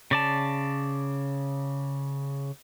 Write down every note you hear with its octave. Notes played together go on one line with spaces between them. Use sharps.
C#3 D5 A5